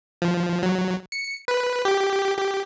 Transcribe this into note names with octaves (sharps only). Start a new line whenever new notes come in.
F3
F#3
C#7
B4
G4
G4